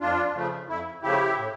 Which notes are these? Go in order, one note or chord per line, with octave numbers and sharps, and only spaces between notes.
F2 D4 F4
C#3 F3 A3
F2 E4
C#3 F3 A3 E4 G4
A2